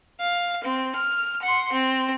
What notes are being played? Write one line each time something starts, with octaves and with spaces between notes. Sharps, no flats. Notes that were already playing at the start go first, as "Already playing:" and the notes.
F5
C4
F6
F#5 C6
C4